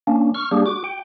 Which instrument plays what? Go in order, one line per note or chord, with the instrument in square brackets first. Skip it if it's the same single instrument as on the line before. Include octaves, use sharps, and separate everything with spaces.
[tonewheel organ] A#3 C#4 D4
C#6 F6
G3 A#3 D4 G4 G#4
F#4 D6
G5